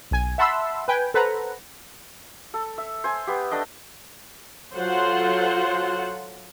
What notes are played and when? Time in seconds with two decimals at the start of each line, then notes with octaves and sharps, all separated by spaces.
0.11 B1 G#5
0.38 E5 F#5 A5 B5 C6 E6
0.88 B4 G5 G#5
1.14 A4 B4 C5 F#5 A#5
2.54 A4
2.78 E5
3.04 C5 G#5
3.27 B3 G4
3.51 A3 D4 D#5
4.75 F#3 F4 F#4 A4 C5 F#5